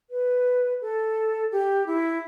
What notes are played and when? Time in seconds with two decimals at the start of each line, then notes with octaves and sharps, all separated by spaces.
0.10 B4
0.81 A4
1.52 G4
1.86 E4